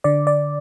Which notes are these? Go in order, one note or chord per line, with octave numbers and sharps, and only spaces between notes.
D3 D5
D5